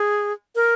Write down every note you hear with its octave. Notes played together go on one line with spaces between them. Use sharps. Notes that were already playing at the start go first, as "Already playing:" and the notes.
Already playing: G#4
A#4